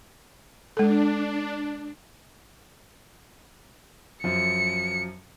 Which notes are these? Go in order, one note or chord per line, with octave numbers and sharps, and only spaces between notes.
G#3 D4 A4
F#2 F3 C#7